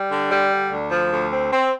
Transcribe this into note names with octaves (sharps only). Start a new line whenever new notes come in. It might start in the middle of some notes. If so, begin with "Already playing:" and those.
Already playing: G3
D3
G3
D3
D2
F3
D2
C4
C4